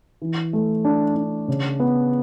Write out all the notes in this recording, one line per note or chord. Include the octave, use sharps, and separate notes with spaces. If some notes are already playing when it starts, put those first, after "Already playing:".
E3
A3
D4
D4
C#3
B3